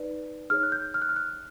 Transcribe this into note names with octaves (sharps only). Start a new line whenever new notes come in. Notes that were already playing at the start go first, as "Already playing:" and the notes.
Already playing: D#4 B4 D5
D#4 G#4 C#5 F6
F#6
G6
F6
F#6
F6
F#6